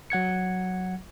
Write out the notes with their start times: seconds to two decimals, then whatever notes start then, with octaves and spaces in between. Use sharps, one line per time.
0.10 F#3 F#5 G#6 C#7